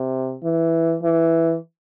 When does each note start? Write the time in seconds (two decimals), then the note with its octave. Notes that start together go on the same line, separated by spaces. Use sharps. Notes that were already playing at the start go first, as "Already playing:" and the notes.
Already playing: C3
0.44 E3
1.03 E3